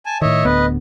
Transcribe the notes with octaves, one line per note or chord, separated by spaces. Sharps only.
G#5 A5
A2 D#3 C#5 D#5 E5
D1 D2 B3 B4 D#5